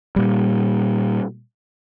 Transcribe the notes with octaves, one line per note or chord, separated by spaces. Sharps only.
A#2 G3